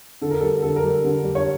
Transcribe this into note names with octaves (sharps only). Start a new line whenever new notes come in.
D3 A4
A#4
G3 A4
D3 A4
A#4
G3
D3
G3
C#5